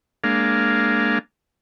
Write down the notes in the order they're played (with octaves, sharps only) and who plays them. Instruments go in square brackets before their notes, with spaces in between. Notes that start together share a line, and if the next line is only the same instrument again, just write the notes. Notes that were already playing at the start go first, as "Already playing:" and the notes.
[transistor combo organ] G#3 A#3 D4 F5